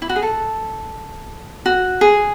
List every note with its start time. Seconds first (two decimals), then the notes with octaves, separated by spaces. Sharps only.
0.02 E4
0.09 F#4
0.16 G#4
0.23 A4
1.66 F#4
2.01 G#4